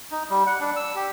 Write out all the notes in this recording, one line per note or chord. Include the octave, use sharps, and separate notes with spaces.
D#4
G3
F#5
D4
E6
G4